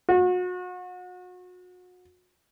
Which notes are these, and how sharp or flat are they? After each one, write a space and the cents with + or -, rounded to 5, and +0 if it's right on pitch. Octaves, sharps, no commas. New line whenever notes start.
F#4 -35